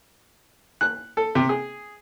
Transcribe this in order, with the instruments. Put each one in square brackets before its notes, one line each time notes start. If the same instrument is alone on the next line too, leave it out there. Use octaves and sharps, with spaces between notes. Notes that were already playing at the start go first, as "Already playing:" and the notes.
[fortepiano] F#6
A4
C3
G#4